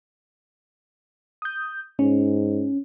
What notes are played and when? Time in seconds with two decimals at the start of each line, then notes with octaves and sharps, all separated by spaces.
1.42 D#6 G6
1.99 G#2 C#4